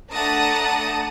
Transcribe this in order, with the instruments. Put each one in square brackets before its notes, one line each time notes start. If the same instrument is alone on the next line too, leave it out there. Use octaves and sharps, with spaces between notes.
[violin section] A3 D4 F#5 A5 A#5 D#6